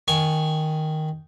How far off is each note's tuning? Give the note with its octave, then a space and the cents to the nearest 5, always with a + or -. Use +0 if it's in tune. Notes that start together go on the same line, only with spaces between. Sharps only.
D#3 +0 G#5 +0 C#6 +0